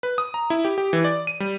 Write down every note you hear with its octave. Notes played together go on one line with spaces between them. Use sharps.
B4
D#6
A#5
E4
G4
G4
E3
D5
D#7
G3